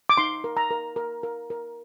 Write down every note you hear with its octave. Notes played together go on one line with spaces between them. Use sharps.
D6
D#4 C6
A#4
A#5
A#4
A#4
A#4
A#4